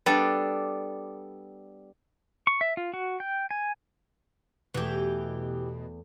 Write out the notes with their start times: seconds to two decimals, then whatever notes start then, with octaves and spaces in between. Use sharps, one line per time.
0.06 G3 B3 D4 A4
2.47 C#6
2.61 E5
2.77 F4
2.94 F#4
3.20 G5
3.51 G#5
4.74 E2 B2 E3 A3 G4